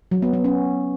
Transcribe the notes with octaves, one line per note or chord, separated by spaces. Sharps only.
F#3
B3
B3
C#4